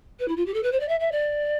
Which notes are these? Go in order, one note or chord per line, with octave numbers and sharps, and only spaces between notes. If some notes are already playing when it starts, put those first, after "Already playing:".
B4
E4
F4
G4
A4
B4
C5
D5
E5
E5
D5